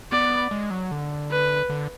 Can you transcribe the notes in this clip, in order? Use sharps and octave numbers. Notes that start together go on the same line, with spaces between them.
B3 D5
G#3
F#3
D3
B4
D3